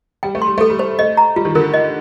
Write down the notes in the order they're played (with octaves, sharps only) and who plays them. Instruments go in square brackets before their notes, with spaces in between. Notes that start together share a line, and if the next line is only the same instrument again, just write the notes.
[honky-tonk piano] G3 [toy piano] G5
[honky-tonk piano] A3
[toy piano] C6
[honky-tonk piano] G3
[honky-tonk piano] A3 [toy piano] A4
[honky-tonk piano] G3
[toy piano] C5
[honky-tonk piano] A3 [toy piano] D#5
[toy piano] A#5
[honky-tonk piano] G3 [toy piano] F4
[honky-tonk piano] D#3
[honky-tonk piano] D3 [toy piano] A#4
[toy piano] D#5